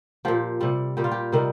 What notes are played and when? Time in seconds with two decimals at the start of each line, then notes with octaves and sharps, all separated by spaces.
0.25 A#2 F3 G4
0.61 C3 G3
0.97 A#2 G3 G4
1.04 F4
1.12 G4
1.32 C3 D#3 G3